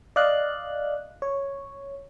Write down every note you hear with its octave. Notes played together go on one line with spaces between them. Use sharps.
D5 D#5 F5 F#6
C#5